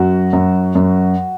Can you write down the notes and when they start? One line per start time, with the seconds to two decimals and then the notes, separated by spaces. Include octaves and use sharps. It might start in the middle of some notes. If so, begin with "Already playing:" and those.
Already playing: F#2 F#3 F#4
0.33 F#2
0.75 F#2